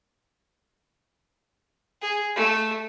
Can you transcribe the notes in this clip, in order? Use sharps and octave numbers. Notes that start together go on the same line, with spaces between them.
G#4
A3